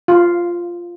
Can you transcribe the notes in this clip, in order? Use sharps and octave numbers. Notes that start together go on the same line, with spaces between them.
F4